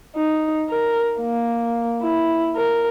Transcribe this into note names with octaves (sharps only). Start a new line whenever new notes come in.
D#4
A#4
A#3
E4
A#4